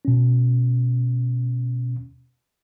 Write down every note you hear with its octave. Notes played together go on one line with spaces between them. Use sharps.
B2 C#4